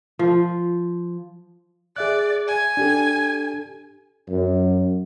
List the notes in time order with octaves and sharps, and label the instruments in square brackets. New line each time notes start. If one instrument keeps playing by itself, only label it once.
[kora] F3
[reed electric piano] G#4 E5 F#6 [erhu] D5
[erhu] G#5
[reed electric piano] D4 G4 A4
[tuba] F#2